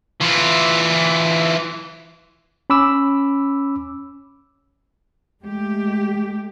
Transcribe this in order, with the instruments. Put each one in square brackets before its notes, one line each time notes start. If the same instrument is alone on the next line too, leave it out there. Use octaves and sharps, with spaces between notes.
[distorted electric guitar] E3 F4
[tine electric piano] C#4 B5 D6 E6
[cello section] G#3 A3 G4